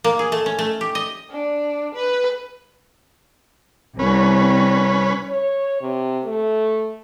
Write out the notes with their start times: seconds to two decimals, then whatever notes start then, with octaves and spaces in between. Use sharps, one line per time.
0.04 A#3
0.19 G#4
0.32 A3
0.46 C#4
0.59 A3
0.81 G4
0.95 D#5
1.30 D4
1.95 B4
3.99 C2 C#4 B4
5.29 C#5
5.81 C3
6.25 A3